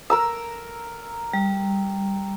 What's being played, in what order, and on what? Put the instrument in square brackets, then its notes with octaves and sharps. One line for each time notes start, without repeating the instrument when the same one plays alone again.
[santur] A#4 A#5 E6
[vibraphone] G3